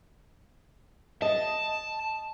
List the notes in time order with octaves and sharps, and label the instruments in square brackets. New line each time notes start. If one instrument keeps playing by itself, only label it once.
[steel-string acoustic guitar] D#5 [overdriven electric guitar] A5